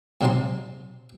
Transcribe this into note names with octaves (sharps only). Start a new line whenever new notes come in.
G#2 C3 F#3 D#4 A5 C6